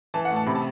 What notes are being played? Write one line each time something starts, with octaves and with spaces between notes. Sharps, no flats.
E3 A5
F#5
A2
A5
C3 B5
A5